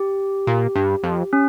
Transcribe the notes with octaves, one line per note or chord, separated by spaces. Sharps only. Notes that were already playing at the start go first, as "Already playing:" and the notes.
Already playing: G4
A#2
G2
F2
C#4